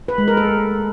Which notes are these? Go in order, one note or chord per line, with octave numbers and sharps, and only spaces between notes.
B4
G#3
A#4
A4